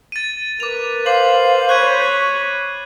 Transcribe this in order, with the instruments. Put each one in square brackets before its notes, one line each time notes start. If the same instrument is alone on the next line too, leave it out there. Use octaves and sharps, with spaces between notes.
[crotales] A6 D#7
[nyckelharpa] A#4 B4 [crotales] D6 F7
[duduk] C5 [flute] F5 [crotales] D6 C7 F#7
[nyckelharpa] C#5 B5 [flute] C#6 [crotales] F#6 G#6 D#7